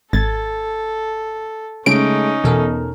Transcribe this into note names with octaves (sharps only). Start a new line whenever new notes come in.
G#1 A4 G#6 A6
C#3 G#3 A3 C#4 D#4 D7
E2 B2 A4 A#4 G#5